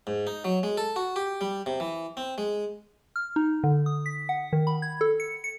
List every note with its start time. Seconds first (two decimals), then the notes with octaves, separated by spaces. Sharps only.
0.07 G#2
0.27 D#4
0.44 F#3
0.63 G#3
0.78 A4
0.96 F#4
1.16 G4
1.41 G3
1.66 C3
1.80 E3
2.17 C4
2.38 G#3
3.16 F6
3.36 D#4
3.64 D3
3.86 D#6
4.06 B6
4.29 F#5
4.53 D#3
4.67 B5
4.82 G#6
5.01 A4
5.20 C#7
5.44 C#7